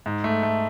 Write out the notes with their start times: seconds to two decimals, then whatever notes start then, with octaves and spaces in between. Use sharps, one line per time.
0.06 G#2
0.24 A3
0.43 A3